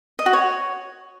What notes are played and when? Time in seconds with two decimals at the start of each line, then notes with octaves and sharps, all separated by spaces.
0.19 D#5
0.26 F#4
0.33 C#5